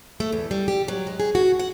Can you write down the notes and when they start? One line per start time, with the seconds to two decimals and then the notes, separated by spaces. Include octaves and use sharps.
0.20 A3
0.32 E2
0.51 G3
0.68 G4
0.88 F#3
1.07 G#3
1.20 G#4
1.35 F#4
1.59 F#5